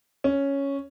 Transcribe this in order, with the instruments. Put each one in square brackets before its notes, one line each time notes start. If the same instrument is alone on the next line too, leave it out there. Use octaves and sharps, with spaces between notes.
[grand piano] C#4